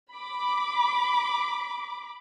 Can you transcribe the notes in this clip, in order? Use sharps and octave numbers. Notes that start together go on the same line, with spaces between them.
B5 D6